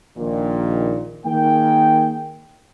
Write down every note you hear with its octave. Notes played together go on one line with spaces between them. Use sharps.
A#1 A#2 D#3
D#3 A#3 G#4 G5